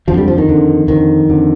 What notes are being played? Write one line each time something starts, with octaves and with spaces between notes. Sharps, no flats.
F2 D3 F3
G3
F3
D#3
F2 D3
F2 D3 D#3
F2 D3